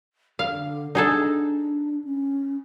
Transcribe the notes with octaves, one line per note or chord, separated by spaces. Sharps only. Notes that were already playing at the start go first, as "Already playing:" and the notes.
D3 F5
D4 D#4 G#4 A4
C#4